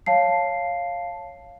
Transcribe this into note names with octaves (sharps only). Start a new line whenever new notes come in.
C#5 F5 A5 C7